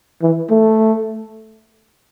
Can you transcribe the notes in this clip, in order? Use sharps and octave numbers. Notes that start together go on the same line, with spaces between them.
E3
A3